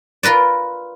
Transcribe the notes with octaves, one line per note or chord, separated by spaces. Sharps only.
F4 A#4 B4 D5